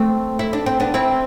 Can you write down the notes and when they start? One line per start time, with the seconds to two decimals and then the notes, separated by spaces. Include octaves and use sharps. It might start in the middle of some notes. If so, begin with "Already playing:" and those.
Already playing: A3 C4
0.39 E4
0.53 D4
0.66 C4
0.80 B3 D4
0.94 C4 E4